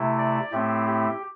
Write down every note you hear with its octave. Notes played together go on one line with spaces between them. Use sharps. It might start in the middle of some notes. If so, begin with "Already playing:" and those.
Already playing: C3 A3 E4
D5
A2 A3 C4 E4 G4
G4